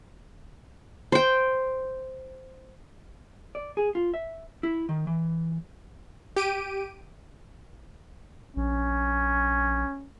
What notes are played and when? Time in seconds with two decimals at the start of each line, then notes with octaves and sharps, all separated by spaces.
1.12 C5 G5
3.55 D5
3.77 G#4
3.95 F4
4.14 E5
4.63 E4
4.89 D#3
5.07 E3
6.36 G4 D7 D#7
8.57 A#1 C#4